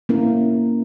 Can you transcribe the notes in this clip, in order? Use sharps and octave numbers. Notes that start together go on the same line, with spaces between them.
A#3 C#4 E4 A#4